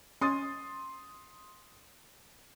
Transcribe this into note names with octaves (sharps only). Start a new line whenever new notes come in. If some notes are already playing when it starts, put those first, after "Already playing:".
C#4 C6 D#6 A6